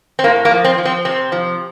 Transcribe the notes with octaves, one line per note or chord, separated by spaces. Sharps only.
C4
A2 A#3
A#3
F3
C4
F3
C4
C3 C4
F3